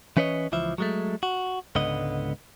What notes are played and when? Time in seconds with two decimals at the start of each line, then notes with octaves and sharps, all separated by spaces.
0.17 E3 C#4 B4 C#5 D#5
0.52 C#2 E3 F3 E5
0.78 F#3 G#3 A3
1.23 F#4
1.76 C#2 G#2 D3 B3 D#5